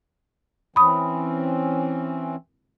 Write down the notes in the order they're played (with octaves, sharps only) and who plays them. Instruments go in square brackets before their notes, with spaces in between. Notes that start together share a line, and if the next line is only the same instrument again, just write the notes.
[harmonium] E3 C4 C#4 [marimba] B5 D#6